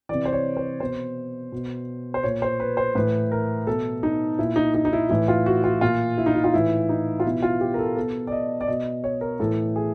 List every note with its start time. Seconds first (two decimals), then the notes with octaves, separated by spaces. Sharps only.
0.09 C3 E3 D5
0.25 C5
0.33 C#5
0.57 C5
0.80 B2 C5
1.52 B2
2.14 C5
2.23 A#2 C#5
2.42 C5
2.60 B4
2.77 C5
2.95 A2 E3 B4
3.32 A#4
3.67 B2 A4
4.03 D#4
4.39 A#2 E4
4.56 D#4
4.74 D#4
4.85 D#4
4.93 E4
5.10 A2 E3 E4
5.28 F4
5.46 F#4
5.64 F4
5.81 A#2 F4
6.18 E4
6.26 D#4
6.35 E4
6.44 F4
6.53 A2 E3 E4
6.89 D#4
7.20 F4
7.25 B2 E4
7.42 F4
7.61 G4
7.74 A#4
7.79 A4
7.96 B2 A4
8.27 D5
8.32 D#5
8.61 D5
8.68 B2 D#5
9.04 C#5
9.21 A#4
9.40 A2 E3 A4
9.76 G#4